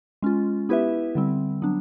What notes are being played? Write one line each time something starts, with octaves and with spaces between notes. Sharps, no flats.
G#3 C#4 F4
B3 E4 G4 B4 E5
D3 G3 C4
F#3 B3 D4